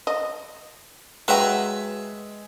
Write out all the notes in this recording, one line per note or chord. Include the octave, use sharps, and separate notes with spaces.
D#5
F#3 G#3 B4 E5 G5 A#5